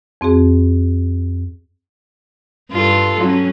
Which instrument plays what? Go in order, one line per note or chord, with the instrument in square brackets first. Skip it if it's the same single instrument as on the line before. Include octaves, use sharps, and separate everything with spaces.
[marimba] F2 C4 F#4 G#4
[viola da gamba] G2 F4 A4
F#3 C#4